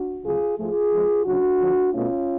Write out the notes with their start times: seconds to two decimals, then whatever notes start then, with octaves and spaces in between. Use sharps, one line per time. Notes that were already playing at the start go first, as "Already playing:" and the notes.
Already playing: D4 F#4
0.24 D2 C#3 F#3 F4 G#4
0.57 G#2 F3 A3 F4 G#4
0.91 F2 F3 G#3
1.25 D2 C#3 F#3 D4 F#4
1.59 F2 D3 F3
1.92 B2 A3 C#4 F4